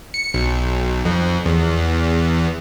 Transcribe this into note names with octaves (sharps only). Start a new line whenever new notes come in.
C#7
B1
F2
E2